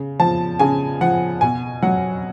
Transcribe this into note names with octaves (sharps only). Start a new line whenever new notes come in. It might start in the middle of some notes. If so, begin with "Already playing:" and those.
Already playing: C#3
F3 A5
C#3 G#5
F3 F#5
B2 G#5
F#3 F#5